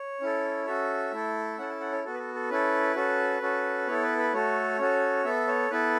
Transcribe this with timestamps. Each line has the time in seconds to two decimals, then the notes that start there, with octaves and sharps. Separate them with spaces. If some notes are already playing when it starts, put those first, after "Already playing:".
Already playing: C#5
0.21 C#4 E4 A4
0.67 C#4 F#4 A4 E5
1.12 A3 E4 A4
1.58 C#4 E4 A4 F#5
1.70 A5
1.80 F#5
1.92 C#5
2.04 B3 F#4 A4
2.14 B4
2.19 A4
2.35 A4
2.50 C#4 E4 A4 B4
2.96 C#4 F#4 A4
3.41 C#4 F#4 A4
3.87 B3 E4 A4 C#5
4.02 B4
4.18 B4
4.33 A3 F#4 A4 C#5
4.79 C#4 F#4 A4
5.25 B3 A4 E5
5.47 C#5
5.70 B3 E4 A4 B4